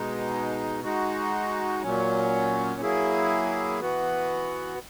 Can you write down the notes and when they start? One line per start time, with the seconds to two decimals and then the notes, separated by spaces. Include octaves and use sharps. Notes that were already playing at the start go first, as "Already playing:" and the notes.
Already playing: B2 G#3 D#4
0.84 G#3 D#4 F#4
1.82 A#2 F#3 C#4
2.81 F#3 A#3 E4 G#4
3.80 E3 B3 F#4